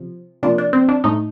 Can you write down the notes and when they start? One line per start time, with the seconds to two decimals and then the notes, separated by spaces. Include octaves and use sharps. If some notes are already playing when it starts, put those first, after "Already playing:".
Already playing: C3 F3
0.43 C3 F3 A#3 D4
0.58 D4
0.73 C4
0.89 D4
1.04 A2 A3 D#4